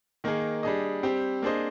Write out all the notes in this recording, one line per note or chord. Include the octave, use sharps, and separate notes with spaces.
D#3 A#3 D#4 G#4
G3 D4 G#4 D#5
G3 C4 G4
A#3 D4 G#4 C5 D#5